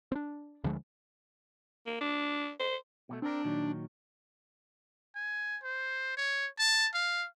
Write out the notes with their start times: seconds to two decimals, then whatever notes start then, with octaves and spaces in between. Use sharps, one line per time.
0.12 C4 D4
0.64 D2 D3 F3 G#3
1.86 A#3
2.01 D4
2.60 C5
3.09 B2 G3 A3
3.22 C4 D4 A#4
3.44 A#2 D#3 F#3
5.16 G#5
5.63 C5
6.17 C#5
6.59 A5
6.94 F5